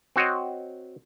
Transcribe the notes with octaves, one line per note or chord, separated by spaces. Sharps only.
C4 F#4 C#5 D#5